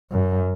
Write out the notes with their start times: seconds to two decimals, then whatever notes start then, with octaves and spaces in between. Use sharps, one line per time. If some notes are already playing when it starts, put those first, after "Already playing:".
0.12 F#2